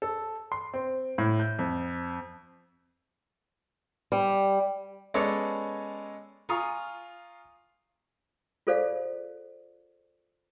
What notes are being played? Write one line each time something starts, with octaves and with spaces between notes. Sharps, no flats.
A4
C6
C4
A2
G6
F2
G3
G#3 B3 C#4 A4 C#5 D5
F4 F5 G#5 A#5 C#6 D#6
F4 G#4 A4 C5 D5 F5